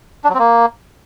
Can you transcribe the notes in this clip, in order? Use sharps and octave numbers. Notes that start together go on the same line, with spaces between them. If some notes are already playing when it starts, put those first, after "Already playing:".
D4
F#3
C4
A#3